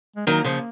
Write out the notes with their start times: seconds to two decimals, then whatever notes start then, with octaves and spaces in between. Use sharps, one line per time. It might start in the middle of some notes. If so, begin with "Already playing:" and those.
0.16 G#3
0.27 D#3 F#3 A#3
0.44 C#3 F3